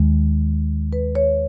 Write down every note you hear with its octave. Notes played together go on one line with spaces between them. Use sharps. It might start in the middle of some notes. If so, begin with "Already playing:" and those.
Already playing: D#2 D#3 G#3
B4
C#5